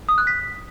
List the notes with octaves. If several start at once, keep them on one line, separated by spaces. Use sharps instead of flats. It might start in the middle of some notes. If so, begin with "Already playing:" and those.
D#6
F#6
B6